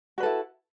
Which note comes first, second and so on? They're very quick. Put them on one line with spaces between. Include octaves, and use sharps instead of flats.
F#4 B4 A4 E4